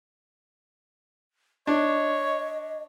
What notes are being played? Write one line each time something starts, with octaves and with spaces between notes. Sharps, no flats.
D4 C#5 D#5